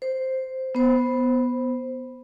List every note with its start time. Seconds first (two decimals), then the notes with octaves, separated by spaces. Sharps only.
0.02 C5
0.75 B3 C5